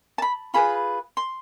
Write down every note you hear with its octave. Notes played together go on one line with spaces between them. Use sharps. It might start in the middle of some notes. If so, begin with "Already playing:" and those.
A5
B5
F4 G#4 B4 B5
C6